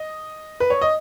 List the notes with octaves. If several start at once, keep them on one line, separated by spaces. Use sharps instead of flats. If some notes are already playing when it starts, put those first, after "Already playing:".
Already playing: D#5
B4
C#5
D#5